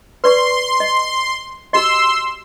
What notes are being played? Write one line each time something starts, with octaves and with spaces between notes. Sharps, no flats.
B4 D5 C6 C#6
D#5
F#4 G4 D#5 C6 E6